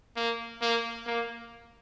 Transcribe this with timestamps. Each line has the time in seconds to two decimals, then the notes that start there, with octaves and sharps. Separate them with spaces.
0.16 A#3
0.62 A#3
1.07 A#3